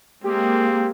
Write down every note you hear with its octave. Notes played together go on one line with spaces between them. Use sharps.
G#3 A#3 C4 G4